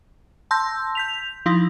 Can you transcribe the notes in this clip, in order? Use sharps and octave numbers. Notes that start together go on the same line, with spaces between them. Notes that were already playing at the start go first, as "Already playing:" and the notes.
A5 C6 E6 G6 A#6
G6 B6 F7
F3 D#4 E4